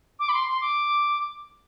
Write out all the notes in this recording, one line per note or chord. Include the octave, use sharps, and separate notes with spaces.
D6
B5
C6
C6
D6